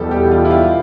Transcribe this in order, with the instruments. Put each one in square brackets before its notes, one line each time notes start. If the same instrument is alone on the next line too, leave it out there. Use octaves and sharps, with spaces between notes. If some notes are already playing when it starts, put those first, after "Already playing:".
Already playing: [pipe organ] E2 B2 G3 [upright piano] A4
[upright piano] G4
F4
E4
F4